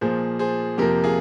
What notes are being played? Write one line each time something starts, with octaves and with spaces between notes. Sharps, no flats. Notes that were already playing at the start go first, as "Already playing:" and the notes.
A#2 F3 A#3 G#4 C5
G#4 C5
F2 C3 F3 A#3 G4 A#4
F4 G#4